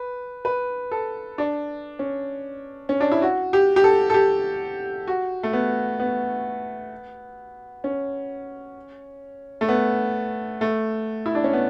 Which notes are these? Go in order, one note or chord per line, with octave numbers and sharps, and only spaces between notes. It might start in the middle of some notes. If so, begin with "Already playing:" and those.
Already playing: B4
B4
A4
D4
C#4
C#4
D4
E4
F#4
G4
G4
A4
A4
G4
F#4
A3
B3
B3
C#4
A3
B3
A3
E4
D4
C#4
B3